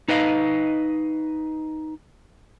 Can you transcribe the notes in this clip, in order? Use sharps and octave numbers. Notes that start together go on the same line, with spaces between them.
D#4 B4 D#5 F5